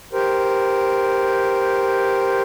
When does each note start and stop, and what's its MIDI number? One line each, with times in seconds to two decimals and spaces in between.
0.13 2.42 67
0.13 2.42 70
0.13 2.42 72